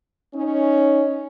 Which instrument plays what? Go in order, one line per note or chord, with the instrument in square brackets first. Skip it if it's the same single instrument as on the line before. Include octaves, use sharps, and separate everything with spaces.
[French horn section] C#4 D#4